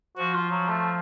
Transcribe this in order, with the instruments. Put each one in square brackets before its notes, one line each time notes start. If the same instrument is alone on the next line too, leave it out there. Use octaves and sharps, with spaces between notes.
[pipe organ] F3 [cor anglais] F#4
[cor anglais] F4
F#3
A3